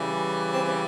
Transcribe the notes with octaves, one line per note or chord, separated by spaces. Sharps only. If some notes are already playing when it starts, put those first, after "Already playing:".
Already playing: C#3 E3 G3
C4